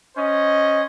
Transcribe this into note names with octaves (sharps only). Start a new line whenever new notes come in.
C#4 C5 D#5